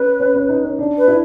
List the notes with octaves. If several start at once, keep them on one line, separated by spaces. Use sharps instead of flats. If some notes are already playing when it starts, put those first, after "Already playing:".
Already playing: C#4 B4
C#4
C#4
D#4
C#4
D4
B4
E4